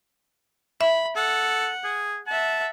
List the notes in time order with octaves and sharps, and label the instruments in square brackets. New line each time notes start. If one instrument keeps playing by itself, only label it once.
[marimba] E5 [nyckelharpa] B5
[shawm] A4 [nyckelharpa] F#5
[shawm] G#4
[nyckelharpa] E5 F#5 [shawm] A5